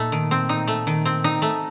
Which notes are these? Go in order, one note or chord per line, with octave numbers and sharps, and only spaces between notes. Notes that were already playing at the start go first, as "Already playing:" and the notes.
Already playing: A#2 A3 D#4
D#3
C4
D#4
A3
D#3
C4
D#4
A3